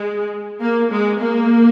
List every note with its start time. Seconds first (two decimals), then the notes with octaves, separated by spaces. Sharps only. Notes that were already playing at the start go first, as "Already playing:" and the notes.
Already playing: G#3
0.61 A#3
0.91 G#3
1.19 A#3